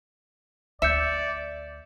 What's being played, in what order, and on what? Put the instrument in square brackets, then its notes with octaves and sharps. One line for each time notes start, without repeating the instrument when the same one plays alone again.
[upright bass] D2 [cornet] D5 [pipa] E5 [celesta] G6 C#7 E7